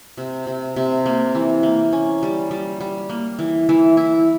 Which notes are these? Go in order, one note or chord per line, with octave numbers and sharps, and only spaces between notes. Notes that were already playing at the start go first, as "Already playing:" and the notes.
C3
C3
C3
A#3
E3
A#3
C#4
G3
G3
G3
A#3
E3
E3
E4